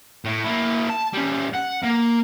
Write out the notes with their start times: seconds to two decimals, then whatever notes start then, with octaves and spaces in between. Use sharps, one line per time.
0.25 A2
0.44 A#3 E4
0.90 A5
1.14 G3 C#4
1.55 F#5
1.84 A#3